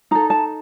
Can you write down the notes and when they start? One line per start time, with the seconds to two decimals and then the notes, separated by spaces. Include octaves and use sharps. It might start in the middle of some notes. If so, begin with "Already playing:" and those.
0.11 D#4 A4 A#5
0.30 A5